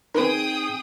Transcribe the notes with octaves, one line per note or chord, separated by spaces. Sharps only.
C4 D#4 G#4 A#4 B4 G5 D#6